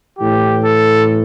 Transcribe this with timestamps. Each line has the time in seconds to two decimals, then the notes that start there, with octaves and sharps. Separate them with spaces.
0.17 A2 E3 G4
0.62 A4